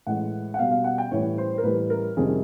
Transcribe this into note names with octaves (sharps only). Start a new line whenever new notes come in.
A2 E3 G#3 F#5
F#5
B2 G3 F5
F5
F#5
G5
A2 E3 G3 C#5
C5
A#4
A2 E3 G3 B4
A#4
F2 C3 D#3 G3 G#4